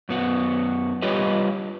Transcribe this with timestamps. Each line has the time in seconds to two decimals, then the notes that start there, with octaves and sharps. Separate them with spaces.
0.09 F#2 B3 F#4
1.02 G3 F4 G4 B4 C#5 D#5